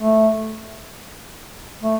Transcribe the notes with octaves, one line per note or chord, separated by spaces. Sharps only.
A3
A3